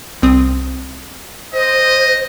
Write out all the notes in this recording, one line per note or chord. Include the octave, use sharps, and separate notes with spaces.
C2 C4 D#6
C5 D#5